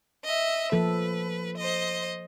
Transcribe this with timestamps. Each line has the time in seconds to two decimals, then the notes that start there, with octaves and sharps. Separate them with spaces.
0.24 D#5 E5
0.72 F3 A#3 A4 B4
1.57 C5 D#5